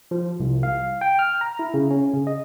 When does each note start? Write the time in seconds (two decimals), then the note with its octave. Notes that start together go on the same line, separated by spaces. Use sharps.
0.11 F3
0.40 C2
0.63 F5
1.01 G5
1.19 F6
1.41 A#5
1.59 E4
1.74 C#3
1.90 C#4
2.13 C#3
2.27 D#5